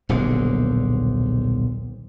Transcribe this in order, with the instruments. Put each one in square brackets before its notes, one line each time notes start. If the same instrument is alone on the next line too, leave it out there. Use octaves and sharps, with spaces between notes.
[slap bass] D#1 B1 G#2 D3